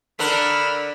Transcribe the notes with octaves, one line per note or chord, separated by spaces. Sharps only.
D3 D4 A#4 B5 E6 F6